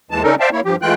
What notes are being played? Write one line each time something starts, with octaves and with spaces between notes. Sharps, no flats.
D#2 E3 G#3 A5
C#3 G3 C#4 D#4 A4 A#4
C5 D5 E5 F5 G5 A5
A#3 E4 C#5
G2 F3 G4
E3 G#3 A3 F4 G5 F#6